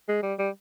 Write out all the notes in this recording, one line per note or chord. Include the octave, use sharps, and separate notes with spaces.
G#3
G3
G3